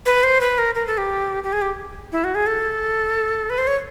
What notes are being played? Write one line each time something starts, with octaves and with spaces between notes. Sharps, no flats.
B4
C5
B4
A#4
A#4
A4
G4
G4
G#4
G4
E4
F#4
G#4
A4
B4
C5
C#5